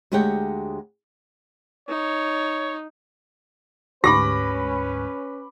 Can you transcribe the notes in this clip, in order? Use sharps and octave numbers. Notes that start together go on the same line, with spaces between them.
D2 G#3 G4 C#5 F#5 G5
D#4 C#5
D2 G#2 C#4 G4 B4 B5 D6 A#6